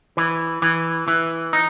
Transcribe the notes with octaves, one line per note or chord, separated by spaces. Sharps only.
E3
E3
E3
D#4